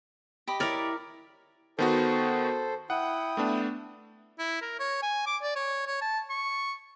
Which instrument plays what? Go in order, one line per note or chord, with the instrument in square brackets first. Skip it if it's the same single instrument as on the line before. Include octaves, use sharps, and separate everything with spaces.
[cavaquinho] G4 D#5 B5
[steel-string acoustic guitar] E4 C#5 [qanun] A#4 D5
[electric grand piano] D#3 B3 F#4 [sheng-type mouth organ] A4 C5
[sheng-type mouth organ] E4 G5 D#6 [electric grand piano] F#5
[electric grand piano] A3 B3 D4
[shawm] E4
A#4
C#5
G#5
D6
D5
C#5
C#5
A5
C#6